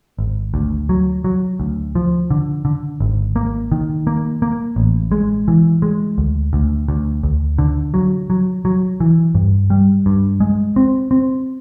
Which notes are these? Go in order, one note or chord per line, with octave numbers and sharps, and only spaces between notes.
G#1
D2
F#3
F#3
D2
F3
D3
D3
G#1
A#3
D#3
A#3
A#3
A1
G#3
E3
G#3
D2
D2
D2
D2
D3
F#3
F#3
F#3
E3
G2
G3
G2
G#3
C4
C4